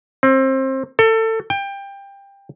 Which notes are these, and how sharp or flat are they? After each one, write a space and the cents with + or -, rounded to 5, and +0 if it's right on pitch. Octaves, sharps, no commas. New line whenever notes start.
C4 +25
A4 +25
G5 +20